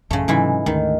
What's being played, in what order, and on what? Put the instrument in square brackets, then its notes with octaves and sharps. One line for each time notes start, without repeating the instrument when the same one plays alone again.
[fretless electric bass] A1 F#2 [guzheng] C#3 A3
[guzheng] G#2 E3 E4 [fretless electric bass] C3 F#3 C#4
[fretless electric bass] D2 A3 [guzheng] D#3